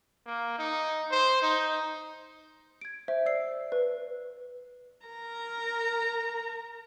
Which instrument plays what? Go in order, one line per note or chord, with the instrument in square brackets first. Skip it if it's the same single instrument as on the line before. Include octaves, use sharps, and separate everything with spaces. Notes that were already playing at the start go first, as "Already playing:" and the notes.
[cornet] A#3
D#4
C5
D#4
[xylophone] G#6 D7
C5 E5
D5 E6 C7
B4
[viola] A#4 A#5